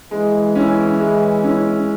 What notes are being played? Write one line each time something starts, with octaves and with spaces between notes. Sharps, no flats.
E3 G#3
C#4 E4
G#3
C#4 E4